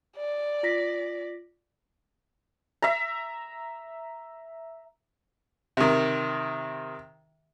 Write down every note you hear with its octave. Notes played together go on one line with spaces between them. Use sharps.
D5
F4 A#6 B6
E5 A#5
C3 D#3